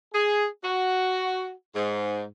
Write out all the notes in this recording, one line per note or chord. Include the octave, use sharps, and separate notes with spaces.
G#4
F#4
G#2